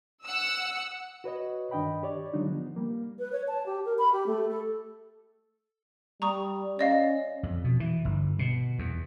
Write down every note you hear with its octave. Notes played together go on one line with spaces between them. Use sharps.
F#5 E6
F#4 B4 C#5 D#5
G2 D#3 D4 D#5 G5 B5
G4 C#5 D5
D3 F#3 G#3 D4 D#4 F4
F3 B3
G3 A#3
B4
C#5
A5
G4
A#4
B5
G4
A3
A4
G3 A#5 C#6 D#6
C#4 D5 D#5 F5
F2
B2
E3
G1
B2
E2